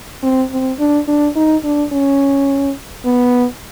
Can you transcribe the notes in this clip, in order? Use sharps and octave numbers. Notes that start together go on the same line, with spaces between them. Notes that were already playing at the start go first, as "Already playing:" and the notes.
C4
C4
D4
D4
D#4
D4
C#4
B3